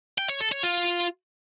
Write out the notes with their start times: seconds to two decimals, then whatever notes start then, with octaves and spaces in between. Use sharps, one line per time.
0.18 G5
0.29 C#5
0.41 A4
0.52 C#5
0.63 F4